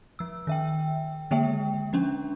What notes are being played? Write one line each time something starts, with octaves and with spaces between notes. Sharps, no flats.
F3 E6
D#3 E5 G5
D3 G#3 A#3 E5 G5
F3 C#4 D4